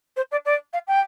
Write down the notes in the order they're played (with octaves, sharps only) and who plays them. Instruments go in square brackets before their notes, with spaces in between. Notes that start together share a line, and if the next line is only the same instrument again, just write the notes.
[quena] C5
D5
D5
F5
G5